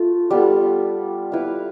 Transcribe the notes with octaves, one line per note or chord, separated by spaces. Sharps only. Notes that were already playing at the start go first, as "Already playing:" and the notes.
Already playing: A3 F4
G3 B3 F4 A4
E4 B4 F5